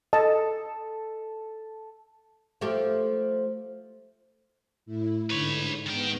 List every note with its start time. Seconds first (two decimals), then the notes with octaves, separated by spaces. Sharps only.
0.13 A4 D#5 A5
2.61 F3 A3 G4
4.86 A2 E4
5.30 G#2 D3 B4 C#5 B5
5.86 G#2 D#3 B3 G5